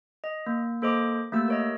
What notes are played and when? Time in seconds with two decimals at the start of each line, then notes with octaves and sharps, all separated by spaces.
0.24 D#5
0.46 A#3
0.82 A#3 A4 C5 D#5 D6
1.32 A3 A#3 G4 E6
1.48 A#4 C#5 D#5